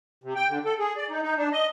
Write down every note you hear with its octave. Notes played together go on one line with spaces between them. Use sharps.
C3
G5
D3
A4
G#4
D5
D#4
D#4
D4
D#5